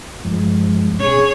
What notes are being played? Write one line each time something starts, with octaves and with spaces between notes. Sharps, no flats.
G2 F3 G#3
B2 C#4 G#4 C#5